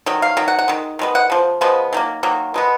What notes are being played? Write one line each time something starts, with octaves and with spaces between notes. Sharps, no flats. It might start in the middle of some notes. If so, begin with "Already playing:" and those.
D#3 F#3
F5
D#3 F#3
F#5
F#5
D#3 G#3
D#3 G#3 B3
F#5
C#3 F3
C#3 F3 G#3 B3
D#3 F#3 A#3
D#3 F#3 A#3
B2 G#3 B3